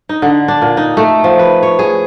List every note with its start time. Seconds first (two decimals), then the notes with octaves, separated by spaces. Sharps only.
0.09 D#4
0.22 D3
0.48 D4
0.62 A#2
0.77 D#4
0.97 A3
1.24 F3
1.39 B4
1.63 C#5
1.79 G#4